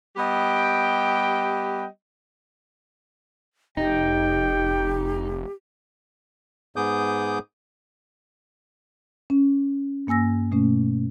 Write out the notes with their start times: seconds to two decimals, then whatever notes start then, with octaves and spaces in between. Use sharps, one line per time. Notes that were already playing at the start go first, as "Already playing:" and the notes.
0.17 G3 B3 G4 D#5 G5
3.77 F1 D#4 G4 G5
6.76 G#2 B3 G#4 D6 D#6 G6
9.30 C#4
10.07 G2 A#3 G#5 E6 A#6
10.52 B2 A3 C#4